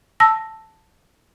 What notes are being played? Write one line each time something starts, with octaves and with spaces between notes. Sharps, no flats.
A5 E6 A#6